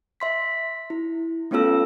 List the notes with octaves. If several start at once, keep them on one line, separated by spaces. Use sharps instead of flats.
E5 C6 B6
E4
A3 B3 C#4 F4 A4 E6